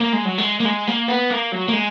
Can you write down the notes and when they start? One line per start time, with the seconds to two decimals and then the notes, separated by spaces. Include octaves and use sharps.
0.01 A#3
0.13 G#3
0.25 F#3
0.38 G#3
0.60 A#3
0.65 G#3
0.87 A#3
1.08 B3
1.30 A#3
1.52 F#3
1.68 A#3
1.73 G#3